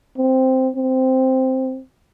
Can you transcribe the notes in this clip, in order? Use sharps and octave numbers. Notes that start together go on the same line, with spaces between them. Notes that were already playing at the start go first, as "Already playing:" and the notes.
C4
C4